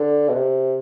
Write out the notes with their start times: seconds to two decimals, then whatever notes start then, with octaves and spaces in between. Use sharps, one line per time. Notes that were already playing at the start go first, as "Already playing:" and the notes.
Already playing: D3
0.29 B2
0.35 C3